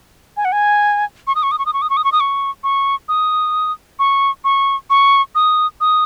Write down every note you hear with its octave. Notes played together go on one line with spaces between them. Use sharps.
G#5
F#5
G#5
C#6
D#6
C#6
D#6
C#6
D#6
C#6
D#6
C#6
D#6
C#6
D#6
C#6
C#6
D#6
C#6
C#6
C#6
D#6
D#6